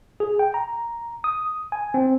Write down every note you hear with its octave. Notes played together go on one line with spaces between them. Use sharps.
G#4
G5
A#5
D#6
G#5
C4